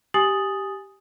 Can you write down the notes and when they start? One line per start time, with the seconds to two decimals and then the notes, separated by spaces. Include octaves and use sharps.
0.14 G4 G#5 D#6 A6 F#7